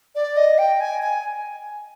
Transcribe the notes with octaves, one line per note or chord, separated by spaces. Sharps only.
D5
D#5
G5
G#5
G#5